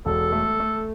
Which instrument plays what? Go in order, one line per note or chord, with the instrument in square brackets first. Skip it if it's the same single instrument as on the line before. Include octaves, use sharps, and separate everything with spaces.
[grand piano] E1 [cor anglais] A4
[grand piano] A3
A3